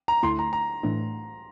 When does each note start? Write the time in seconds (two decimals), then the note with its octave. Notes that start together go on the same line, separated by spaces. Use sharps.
0.08 A#5
0.23 D2 D3 A3 E4 C6
0.39 A#5
0.53 A#5
0.83 A2 E3 A3 D4